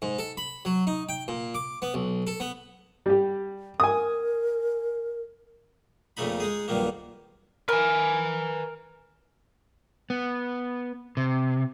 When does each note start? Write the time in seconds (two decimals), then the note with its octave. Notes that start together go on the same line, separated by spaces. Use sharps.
0.02 G#2
0.19 A4
0.37 B5
0.65 F#3
0.87 D#4
1.09 G5
1.28 A#2
1.55 D6
1.82 B3
1.94 B1
2.27 A4
2.40 B3
3.06 G3 G4
3.80 A#4 G#5 D#6
6.17 F2 A#2 C#3 A3 D#4 B5
6.40 G#3 D#4 G#4
6.68 B1 G2 A#2 D#3 F3 A#3
7.69 A#4 B4 G#5
10.10 B3
11.17 C3